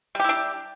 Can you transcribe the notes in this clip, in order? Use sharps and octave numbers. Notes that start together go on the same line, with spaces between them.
G3 D4 E4 G4